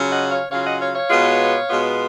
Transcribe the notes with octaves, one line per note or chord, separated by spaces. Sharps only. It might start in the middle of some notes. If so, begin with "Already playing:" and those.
Already playing: C#3 F#3 C#4 F4
D#5 F#5
C#5 F5
C#3 F#3 C#4 F4 C#5 F5
D#5 F#5
C#5 F5
C#5 F5
B2 G#3 B3 F4
B2 G#3 B3 F4